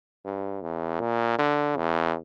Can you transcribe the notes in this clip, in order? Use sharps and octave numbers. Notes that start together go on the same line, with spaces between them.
G2
E2
A#2
D3
E2